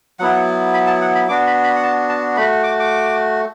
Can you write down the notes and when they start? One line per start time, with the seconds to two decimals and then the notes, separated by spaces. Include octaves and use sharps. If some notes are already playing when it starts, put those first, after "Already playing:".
0.20 F#3 B3 E4 F#5
0.74 B5
0.87 A5
1.02 F#5
1.15 B5
1.29 B3 D4 F#4 D6
1.47 B5
1.64 B5
1.76 F#5
1.83 A5
2.09 A5
2.37 A3 B5
2.40 F#4
2.63 D6
2.80 D6